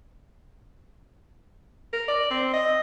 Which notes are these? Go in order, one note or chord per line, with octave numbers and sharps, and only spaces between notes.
A#4
D5
C4
D#5